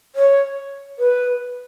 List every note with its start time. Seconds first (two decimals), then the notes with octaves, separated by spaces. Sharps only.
0.16 C#5
0.99 B4